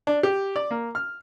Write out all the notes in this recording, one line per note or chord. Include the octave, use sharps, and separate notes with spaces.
D4
G4
D5
A#3
F6